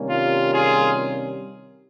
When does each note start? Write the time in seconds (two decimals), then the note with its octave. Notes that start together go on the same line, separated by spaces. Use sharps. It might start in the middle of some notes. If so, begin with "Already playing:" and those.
Already playing: C3 D#3 G3 A#3 C#4
0.09 F4
0.53 F4 G#4